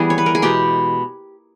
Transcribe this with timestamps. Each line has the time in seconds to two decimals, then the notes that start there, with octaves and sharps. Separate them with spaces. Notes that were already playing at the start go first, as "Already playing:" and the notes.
Already playing: E3 G3 B3 G#4
0.10 C#5
0.18 B4
0.26 A#4
0.35 G#4
0.42 B2 G#3 B3 G4